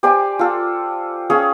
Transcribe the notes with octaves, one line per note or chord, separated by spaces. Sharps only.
G4 C5 D5 G#5
F4 A4
C#4 G#4 C#5 F5